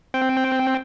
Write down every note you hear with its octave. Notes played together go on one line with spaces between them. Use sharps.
C4 G5